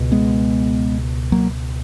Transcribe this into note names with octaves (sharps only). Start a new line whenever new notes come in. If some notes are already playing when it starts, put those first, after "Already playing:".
Already playing: C#2 B2
G#3 B3
F#3 A#3